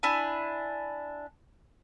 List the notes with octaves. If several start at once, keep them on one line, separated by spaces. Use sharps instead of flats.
D4 E4 G#5